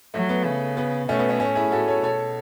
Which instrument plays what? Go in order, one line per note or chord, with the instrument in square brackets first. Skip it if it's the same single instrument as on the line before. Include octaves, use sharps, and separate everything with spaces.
[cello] F#3 [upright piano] A3
[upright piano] B3
[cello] C#3
[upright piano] B3
[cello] B2 [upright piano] A3 C#4
[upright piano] B3
A3 C#4
[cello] A2 [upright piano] A3 C#4
[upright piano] E4 G#4
[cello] A2 [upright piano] F#4 A4
[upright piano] A4 C#5
[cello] B2 [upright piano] A4 C#5